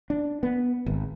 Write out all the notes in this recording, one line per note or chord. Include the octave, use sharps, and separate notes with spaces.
D4
B3
G#1